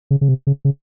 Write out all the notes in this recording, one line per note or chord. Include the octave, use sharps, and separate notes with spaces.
C#3
C#3
C3
C#3
C#3